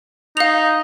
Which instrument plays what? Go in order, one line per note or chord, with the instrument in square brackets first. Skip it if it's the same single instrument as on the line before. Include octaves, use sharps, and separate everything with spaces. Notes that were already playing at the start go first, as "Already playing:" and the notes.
[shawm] D#4 [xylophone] F5 F7